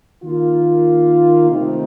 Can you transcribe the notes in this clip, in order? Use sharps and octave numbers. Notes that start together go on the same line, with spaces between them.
D#3 A#3 F4
C3 D#3 A3 C4 D#4